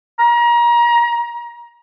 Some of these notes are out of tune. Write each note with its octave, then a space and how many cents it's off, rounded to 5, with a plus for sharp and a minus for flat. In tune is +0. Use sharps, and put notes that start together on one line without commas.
A#5 +30